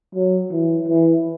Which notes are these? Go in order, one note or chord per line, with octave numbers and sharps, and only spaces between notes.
F#3
E3
E3